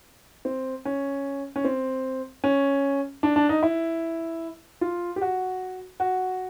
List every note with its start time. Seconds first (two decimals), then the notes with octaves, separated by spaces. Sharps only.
0.45 C4
0.85 C#4
1.56 C#4
1.64 C4
2.44 C#4
3.23 D4
3.36 D4
3.49 D#4
3.63 E4
4.81 F4
5.16 G4
5.21 F#4
6.00 F#4